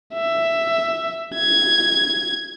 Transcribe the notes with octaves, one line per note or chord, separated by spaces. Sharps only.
E5
G#6